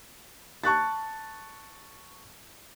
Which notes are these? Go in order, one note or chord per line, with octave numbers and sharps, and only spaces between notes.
A5 C#6 F#6 A6